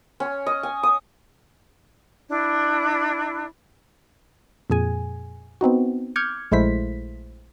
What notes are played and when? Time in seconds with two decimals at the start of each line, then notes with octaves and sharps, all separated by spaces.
0.20 C#4
0.46 D#5
0.63 G#5
0.83 D#6
2.29 D4 E4
4.70 F2 A#2 G#4 G#5
5.61 B3 C4 D#4 F#4
6.16 D6 F6 G6 G#6 C#7
6.51 A#1 G#3 A3 E4 C5 B6